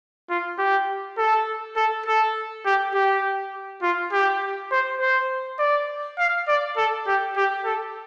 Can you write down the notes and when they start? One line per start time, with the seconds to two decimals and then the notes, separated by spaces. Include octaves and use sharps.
0.30 F4
0.58 G4
1.18 A4
1.77 A4
2.06 A4
2.66 G4
2.94 G4
3.82 F4
4.12 G4
4.71 C5
5.00 C5
5.59 D5
6.18 F5
6.48 D5
6.77 A4
7.07 G4
7.37 G4
7.65 A4